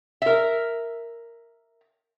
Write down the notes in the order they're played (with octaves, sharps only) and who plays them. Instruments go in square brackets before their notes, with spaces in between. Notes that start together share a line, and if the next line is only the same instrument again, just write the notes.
[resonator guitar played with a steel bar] A#4 E5